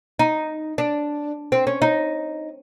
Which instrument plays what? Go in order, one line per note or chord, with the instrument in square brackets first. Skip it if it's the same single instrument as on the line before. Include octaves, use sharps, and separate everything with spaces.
[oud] D#4
D4
C4
C#4
D#4